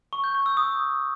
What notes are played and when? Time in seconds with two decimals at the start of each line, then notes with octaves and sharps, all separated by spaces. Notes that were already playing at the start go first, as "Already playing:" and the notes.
0.13 C#6
0.24 G6
0.35 G6
0.46 E6
0.57 D#6